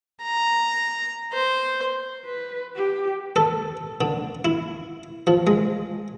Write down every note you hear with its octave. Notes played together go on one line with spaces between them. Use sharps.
A#5
C5
B4
G4
A4
D3
E4
F3
G#3